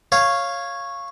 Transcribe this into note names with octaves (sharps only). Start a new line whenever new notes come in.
C#5 F5